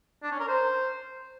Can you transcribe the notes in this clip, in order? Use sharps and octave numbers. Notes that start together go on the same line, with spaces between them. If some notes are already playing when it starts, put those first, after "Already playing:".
D4
C#4
A#4
C5